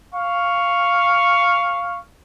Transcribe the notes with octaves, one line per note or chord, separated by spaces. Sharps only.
F5 C#6